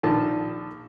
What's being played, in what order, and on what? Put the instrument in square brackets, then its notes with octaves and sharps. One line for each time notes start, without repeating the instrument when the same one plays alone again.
[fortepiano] A#1 D#3 F3 A4 A5